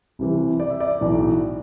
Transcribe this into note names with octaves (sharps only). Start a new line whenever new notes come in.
C2 C3 E3
D5
E5
D5
B1 A2 E3